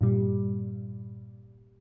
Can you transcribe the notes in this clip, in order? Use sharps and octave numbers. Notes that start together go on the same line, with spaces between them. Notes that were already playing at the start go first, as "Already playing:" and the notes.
G2 A#2 G3